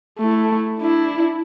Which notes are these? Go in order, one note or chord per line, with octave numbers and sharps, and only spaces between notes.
A3 E4
D4 E4